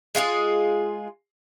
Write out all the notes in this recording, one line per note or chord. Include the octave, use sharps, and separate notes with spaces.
G#3 F4 F#4 G#4